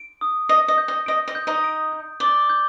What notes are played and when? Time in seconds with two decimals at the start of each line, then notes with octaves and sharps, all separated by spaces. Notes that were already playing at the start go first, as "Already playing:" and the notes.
Already playing: D7
0.21 D#6
0.49 D#5 D#6
0.68 D#5
0.78 G6
0.88 D#5
1.06 D#5 D7
1.28 D#5
1.35 G6
1.47 D#4 D#5
1.64 D7
1.92 G6
2.20 D5 G7
2.50 G6